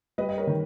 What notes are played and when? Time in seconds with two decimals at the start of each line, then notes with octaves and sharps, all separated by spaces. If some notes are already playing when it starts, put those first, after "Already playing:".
0.18 G3 B4 D#5
0.29 D#5
0.38 A#4 C#5
0.47 D#3